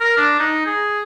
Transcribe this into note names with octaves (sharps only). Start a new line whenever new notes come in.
A#4
D4
D#4
G#4